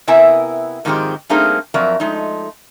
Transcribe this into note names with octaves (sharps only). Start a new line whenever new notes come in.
C3 B3 E4 A#4 E5 G#5
G#2 D#3 F3 G#3 C4 G4
G3 A3 A#3 C4 D#4 G#4
F2 F#3 A#4 D5 E5
F3 G#3 A3 D#4